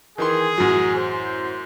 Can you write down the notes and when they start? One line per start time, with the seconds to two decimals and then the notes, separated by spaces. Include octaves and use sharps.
0.18 D#3 E3 G#4 A#4 G#5 C6
0.58 A1 F#2 F#3 F#4
0.96 C5